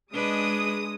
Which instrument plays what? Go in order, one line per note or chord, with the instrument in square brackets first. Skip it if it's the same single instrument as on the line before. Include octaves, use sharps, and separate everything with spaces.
[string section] G#3 D#6 [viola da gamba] D4 B4